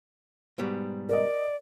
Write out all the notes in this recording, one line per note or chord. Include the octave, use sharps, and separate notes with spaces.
G#2 B2 G3
A#4 D5 D#5